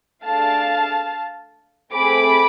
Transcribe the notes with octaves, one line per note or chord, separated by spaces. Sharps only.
A3 D4 G#4 F5 A5
A3 C4 G#4 B5 D6